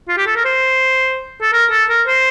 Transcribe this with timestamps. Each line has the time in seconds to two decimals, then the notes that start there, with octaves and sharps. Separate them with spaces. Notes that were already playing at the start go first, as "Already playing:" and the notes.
0.08 F4
0.17 G4
0.27 A4
0.36 A#4
0.45 C5
1.41 A4
1.53 A#4
1.71 A4
1.89 A#4
2.07 C5